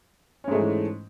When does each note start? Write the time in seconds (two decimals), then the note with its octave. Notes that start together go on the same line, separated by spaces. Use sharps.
0.44 C#4
0.48 G#2
0.51 A3
0.55 G#3
0.59 E3